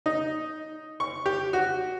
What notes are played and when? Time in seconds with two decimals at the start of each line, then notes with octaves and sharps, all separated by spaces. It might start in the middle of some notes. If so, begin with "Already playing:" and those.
0.06 D#4
1.00 C#6
1.26 G4
1.53 F#4